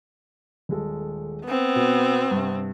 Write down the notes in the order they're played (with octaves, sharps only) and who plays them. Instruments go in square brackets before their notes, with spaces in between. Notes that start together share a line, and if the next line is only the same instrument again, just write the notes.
[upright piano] D#1 G#3 A4
[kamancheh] B3 C4
[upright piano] B2
G2 C3